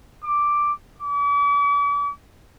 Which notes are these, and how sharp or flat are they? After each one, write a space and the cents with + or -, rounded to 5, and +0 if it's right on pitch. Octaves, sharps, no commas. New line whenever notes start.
D6 +0
D6 -45